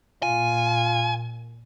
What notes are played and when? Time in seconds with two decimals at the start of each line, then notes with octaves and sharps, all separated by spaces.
0.23 A#2 F4 G#5